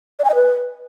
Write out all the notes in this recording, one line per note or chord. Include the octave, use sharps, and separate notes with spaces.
D5
G#5
D#5
B4